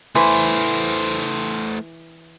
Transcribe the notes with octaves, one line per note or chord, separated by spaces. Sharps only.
E3 A3 C5 C6